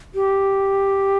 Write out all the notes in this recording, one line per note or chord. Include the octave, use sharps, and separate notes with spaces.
G4